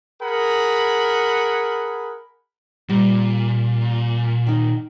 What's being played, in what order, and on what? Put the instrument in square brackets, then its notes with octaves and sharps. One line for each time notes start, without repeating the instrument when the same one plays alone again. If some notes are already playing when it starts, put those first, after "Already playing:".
[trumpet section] G#4 A#4 F#5 B5
[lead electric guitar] A#2 [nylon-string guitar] G3
[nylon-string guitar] D#3 D#4